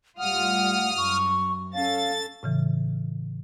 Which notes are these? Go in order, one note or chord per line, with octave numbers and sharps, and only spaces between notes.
A2 G3 F4 F#5 D#6 F6
F#2 C#6
C#4 A4 F5 A6
A2 C#3 E3